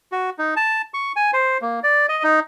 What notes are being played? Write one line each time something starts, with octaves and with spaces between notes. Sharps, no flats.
F#4
D#4
A5
C#6
G#5
C5
A#3
D5
D#5
D#4